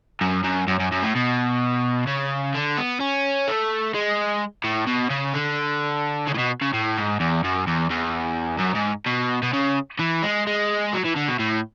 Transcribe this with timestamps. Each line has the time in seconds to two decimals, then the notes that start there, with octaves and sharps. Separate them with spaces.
0.21 F#2
0.44 F#2
0.68 F#2
0.79 F#2
0.92 F#2
1.03 A2
1.15 B2
2.07 C#3
2.55 D3
2.78 B3
3.01 C#4
3.48 A3
3.94 G#3
4.64 A2
4.87 B2
5.10 C#3
5.34 D3
6.27 C#3
6.34 A2
6.38 B2
6.61 C#3
6.73 A2
6.97 G#2
7.20 E2
7.44 F#2
7.67 E2
7.90 E2
8.60 F#2
8.76 G#2
9.07 B2
9.43 B2
9.53 C#3
10.00 E3
10.23 G#3
10.47 G#3
10.93 F#3
11.04 E3
11.16 D3
11.28 B2
11.39 A2